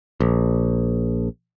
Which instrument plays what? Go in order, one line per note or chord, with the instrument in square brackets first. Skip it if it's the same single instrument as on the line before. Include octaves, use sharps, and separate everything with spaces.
[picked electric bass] A#1